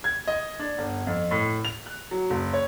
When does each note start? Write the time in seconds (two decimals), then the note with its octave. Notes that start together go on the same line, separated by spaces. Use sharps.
0.04 G#6
0.27 D#5
0.59 D4
0.78 G1
1.07 F2
1.31 A2
1.65 F7
1.86 F#6
2.11 F#3
2.30 F#1
2.54 C#5